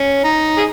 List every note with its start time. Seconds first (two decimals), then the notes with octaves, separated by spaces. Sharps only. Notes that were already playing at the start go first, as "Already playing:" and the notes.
Already playing: C#4
0.24 D#4
0.57 G#4